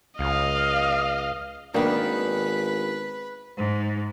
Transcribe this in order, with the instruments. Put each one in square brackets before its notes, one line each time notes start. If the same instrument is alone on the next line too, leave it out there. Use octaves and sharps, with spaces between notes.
[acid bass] C#2 [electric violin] D#5 F5
[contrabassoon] G#1 [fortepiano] D#3 A#3 [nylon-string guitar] B3 D4 [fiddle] B4
[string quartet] G#2